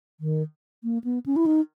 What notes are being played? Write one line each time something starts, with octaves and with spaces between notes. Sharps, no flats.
D#3
A#3
B3
C#4
E4
D#4